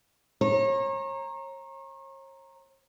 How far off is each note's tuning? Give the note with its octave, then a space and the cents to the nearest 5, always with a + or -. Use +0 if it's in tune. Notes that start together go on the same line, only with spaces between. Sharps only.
C#5 -40 A#5 +0